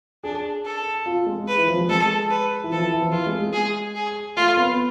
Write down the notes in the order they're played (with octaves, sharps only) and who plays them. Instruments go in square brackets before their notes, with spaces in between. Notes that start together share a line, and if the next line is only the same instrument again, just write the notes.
[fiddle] D4 [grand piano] G#4
[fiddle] A4
[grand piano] F4
G#3
[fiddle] B4
[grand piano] E3
F3
G#3
F3
[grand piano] G#3 [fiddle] A4
[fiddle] B4
[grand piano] E3
[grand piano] F3 [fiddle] A4
[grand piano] E3
E3
F3
[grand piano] E3 [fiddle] F4
[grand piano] G#3
G#3
[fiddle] G#4
G#4
[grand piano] A3 [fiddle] F4
[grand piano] B3